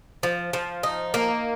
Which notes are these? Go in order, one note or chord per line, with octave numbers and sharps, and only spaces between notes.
F3
F3
D#4
A#3